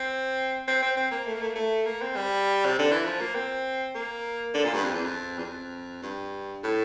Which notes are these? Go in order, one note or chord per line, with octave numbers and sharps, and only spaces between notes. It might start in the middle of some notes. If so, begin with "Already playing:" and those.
Already playing: C4
C4
C4
C4
A#3
A3
A#3
A3
A#3
A3
A#3
C4
G3
C3
D3
E3
F3
A#3
C4
A#3
D3
A#2
G2
F2
E2
F2
E2
F2
G2
A2